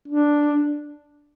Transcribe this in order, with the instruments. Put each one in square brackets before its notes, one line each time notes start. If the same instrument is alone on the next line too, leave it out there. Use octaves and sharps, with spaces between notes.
[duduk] D4